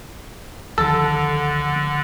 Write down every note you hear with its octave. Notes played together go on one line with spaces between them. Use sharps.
C#2 D3 D#3 F3 A4